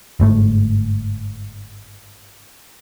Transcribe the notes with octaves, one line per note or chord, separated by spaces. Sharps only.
G1 G#2 A3